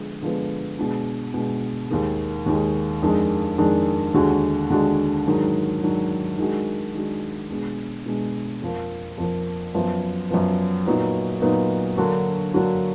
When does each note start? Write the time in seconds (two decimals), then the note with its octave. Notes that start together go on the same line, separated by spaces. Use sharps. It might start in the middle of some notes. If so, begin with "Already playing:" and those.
Already playing: D3 F3 G#3 B3
0.22 D3 F3 G#3 B3
0.79 B2 G#3 D4
1.34 B2 G#3 D4
1.90 D#2 D#3 G#3
2.46 D#2 D#3 G#3
3.03 F2 D#3 G#3 D4
3.58 F2 D#3 G#3 D4
4.14 D#2 D3 G#3 D4 F#4
4.70 D#2 D3 G#3 D4 F#4
5.26 G#2 D#3 F#3 D4
5.82 G#2 D#3 F#3 D4
6.38 D#3 G#3 D4 F#4
6.95 D#3 G#3 D4 F#4
7.50 B2 G#3 D4
8.06 B2 G#3 D4
8.62 F2 F3 A#3
9.18 F2 F3 A#3
9.74 F#2 F3 B3
10.31 F#2 F3 B3
10.86 A#2 F#3 B3 D#4
11.42 A#2 F#3 B3 D#4
11.98 D3 F#3 A#3 D4 F#4
12.54 D3 F#3 A#3 D4 F#4